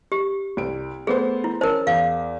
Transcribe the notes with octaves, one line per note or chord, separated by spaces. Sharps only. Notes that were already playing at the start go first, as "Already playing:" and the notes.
G4
C2 D7
A3 B3 G#4 C5
E4
C#4 A#4 C5 A5
E2 F5